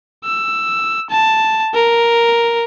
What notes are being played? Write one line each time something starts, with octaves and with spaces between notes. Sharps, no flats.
E6
A5
A#4